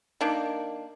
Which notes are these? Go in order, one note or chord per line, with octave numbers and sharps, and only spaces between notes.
D#3 A#3 D4